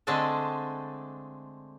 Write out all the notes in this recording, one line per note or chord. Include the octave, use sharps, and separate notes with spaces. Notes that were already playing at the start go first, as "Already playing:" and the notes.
D3 G#3 A3 C4 D4 A4